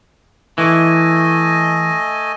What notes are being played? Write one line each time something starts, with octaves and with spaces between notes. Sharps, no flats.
E3 A3 D#5 G#5